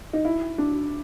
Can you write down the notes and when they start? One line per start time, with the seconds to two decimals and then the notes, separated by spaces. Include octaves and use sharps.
0.13 D#4
0.25 E4
0.58 D4